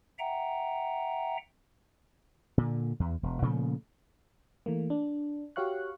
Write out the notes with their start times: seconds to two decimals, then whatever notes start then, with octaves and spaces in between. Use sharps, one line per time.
0.19 E5 F#5 G5 A#5
2.58 A#2 D3
3.00 E2
3.23 E1
3.42 A#2 C#3 F3 A3
4.66 E3 A3 A#3
4.90 D4
5.56 F#4 G4 C#5 F5 C#6 F#6